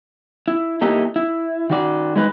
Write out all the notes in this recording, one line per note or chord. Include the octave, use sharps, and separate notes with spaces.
E4
A3 A#3 D#4 E4 G4
E4
D#3 F#4 D5
G#3 D#4 B4